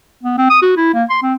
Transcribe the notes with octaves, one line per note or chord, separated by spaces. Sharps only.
B3
C4
D#6
F#4
E4
A#3
C6
C4